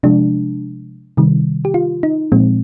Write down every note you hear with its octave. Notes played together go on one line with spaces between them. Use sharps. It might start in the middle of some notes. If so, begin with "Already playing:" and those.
C3 F3 G#3 D4
C3 D#3 G3
G4
F4
D#4
A#2 F3 G#3 C4